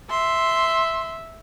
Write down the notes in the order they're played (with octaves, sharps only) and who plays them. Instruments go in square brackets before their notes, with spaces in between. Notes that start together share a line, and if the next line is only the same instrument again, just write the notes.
[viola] E5 [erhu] C6